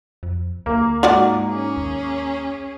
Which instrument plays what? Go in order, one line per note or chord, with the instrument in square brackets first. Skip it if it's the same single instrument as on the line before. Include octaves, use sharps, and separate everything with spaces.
[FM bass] F2
[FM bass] D2 [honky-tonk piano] A#3
[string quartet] G#2 [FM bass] D#4 [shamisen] F4 F#4 D5
[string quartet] C#4 G#4
[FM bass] D#2